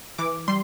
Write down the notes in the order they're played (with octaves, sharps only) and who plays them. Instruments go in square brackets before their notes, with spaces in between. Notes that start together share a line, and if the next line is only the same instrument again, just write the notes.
[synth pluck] E3 D6
G3 C6